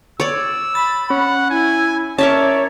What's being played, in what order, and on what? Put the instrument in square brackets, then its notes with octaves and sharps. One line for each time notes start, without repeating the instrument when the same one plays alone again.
[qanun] C#5 D5 [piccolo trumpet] E6
[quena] B5 [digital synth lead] A6
[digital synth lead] C#4 [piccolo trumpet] F#5
[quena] E4 [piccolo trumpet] G#5
[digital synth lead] C#4 [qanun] A#4 E5 A5 [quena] C#5 [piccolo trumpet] D5